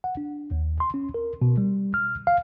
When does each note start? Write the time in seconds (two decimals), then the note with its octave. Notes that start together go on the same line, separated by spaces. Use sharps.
0.04 F#5
0.17 D4
0.51 D#2
0.80 C6
0.94 C#4
1.14 A#4
1.42 B2
1.57 G3
1.94 F6
2.27 F5